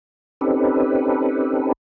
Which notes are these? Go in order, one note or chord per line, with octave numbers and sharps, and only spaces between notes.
C4 C#4 D#4 G4 A4 B4